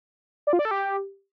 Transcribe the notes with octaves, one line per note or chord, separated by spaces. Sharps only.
D5
F4
D5
A4
G4